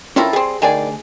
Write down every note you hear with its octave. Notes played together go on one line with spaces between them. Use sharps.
C4 C#4 E4 F4 A4 A#4
G3 C4 G#4
D2 D#3 D4 G#4 D5 G#5